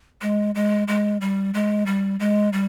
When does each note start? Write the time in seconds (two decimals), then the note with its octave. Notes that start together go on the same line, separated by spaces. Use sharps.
0.22 G#3
0.55 G#3
0.88 G#3
1.21 G3
1.54 G#3
1.86 G3
2.20 G#3
2.53 G3